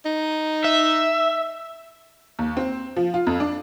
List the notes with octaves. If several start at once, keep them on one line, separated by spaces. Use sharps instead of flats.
D#4
E5
D#2
C4
F3
F4
F2
D4